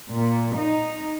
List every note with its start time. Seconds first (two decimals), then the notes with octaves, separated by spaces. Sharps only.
0.12 A#2
0.58 D#4